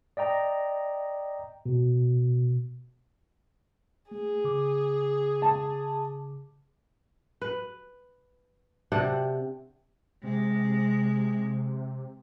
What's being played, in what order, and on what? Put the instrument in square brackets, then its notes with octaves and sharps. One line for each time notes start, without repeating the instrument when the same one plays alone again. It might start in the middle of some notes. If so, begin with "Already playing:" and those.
[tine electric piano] D5 D#5 G5 A#5
B2
[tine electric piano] A3 [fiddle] G#4
[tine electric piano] C#3 D6
[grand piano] A5
[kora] B4
C3 D4 F#5 G5
[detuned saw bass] C3 [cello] G#3